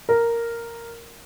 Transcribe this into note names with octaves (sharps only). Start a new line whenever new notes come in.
A#4